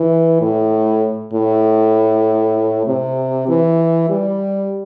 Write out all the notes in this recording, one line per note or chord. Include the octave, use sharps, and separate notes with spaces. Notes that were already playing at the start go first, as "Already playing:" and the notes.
Already playing: E3
A2
A2
C3
E3
G3